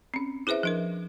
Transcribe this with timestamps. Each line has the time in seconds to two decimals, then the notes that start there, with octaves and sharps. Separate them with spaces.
0.14 C4 C#4
0.47 E4 G#4 B4 C5 E5
0.63 F3 D4 A#4